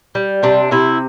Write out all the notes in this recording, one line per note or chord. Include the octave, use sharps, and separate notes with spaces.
G3
C3 D4
C3 E4